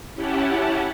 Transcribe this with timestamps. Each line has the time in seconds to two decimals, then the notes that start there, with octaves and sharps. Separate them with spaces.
0.14 C#4 E4 G4 F#5 A5